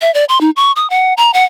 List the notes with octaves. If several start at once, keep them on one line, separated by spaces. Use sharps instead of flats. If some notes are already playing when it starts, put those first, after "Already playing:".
E5
D5
C6
D#4
C#6
D#6
F#5
A#5
F#5